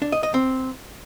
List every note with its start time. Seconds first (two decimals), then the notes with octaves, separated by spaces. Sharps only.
0.02 D4
0.12 D#5
0.23 D#5
0.34 C4